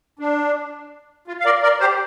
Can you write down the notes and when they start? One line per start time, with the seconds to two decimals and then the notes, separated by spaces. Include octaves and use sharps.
0.19 D4
1.27 F4
1.40 F5
1.45 A#4 D5
1.63 A#4 D5
1.80 G4 C5